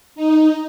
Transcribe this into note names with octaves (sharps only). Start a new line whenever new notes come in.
D#4